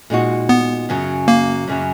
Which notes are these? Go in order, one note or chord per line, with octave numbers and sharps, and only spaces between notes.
A#2 G#3 D#4 F#4
B3
F#2 C#3 F#3
A#3
F#2 C#3 F#3